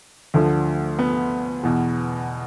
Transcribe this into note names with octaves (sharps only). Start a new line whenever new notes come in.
D2 D3 F3
B3
E2 B2